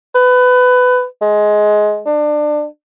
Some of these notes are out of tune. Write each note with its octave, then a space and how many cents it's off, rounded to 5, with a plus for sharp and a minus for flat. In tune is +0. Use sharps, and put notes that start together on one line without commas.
B4 +20
G#3 +15
D4 +25